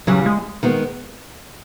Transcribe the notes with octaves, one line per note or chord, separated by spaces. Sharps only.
C#3 E3 F#3 G3
G#3
D#3 G#3 B3